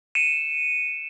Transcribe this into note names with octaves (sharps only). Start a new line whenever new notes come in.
C#7 D#7 E7